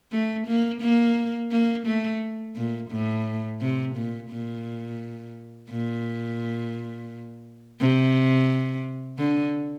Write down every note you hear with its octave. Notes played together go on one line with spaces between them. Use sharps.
A3
A#3
A#3
A#3
A3
A#2
A2
C3
A#2
A#2
A#2
C3
D3